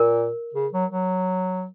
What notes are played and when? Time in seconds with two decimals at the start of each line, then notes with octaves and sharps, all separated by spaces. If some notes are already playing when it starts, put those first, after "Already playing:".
Already playing: A#2 A#4
0.54 C#3
0.73 F#3
0.91 F#3